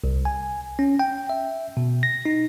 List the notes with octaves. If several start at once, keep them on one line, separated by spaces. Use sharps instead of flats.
C2
G#5
C#4
G5
E5
B2
A#6
D#4